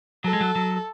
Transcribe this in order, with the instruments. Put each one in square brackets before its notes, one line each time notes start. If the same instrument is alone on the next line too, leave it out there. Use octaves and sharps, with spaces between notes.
[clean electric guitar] F#3 [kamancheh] A4
[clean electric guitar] G#3
F#3
F#3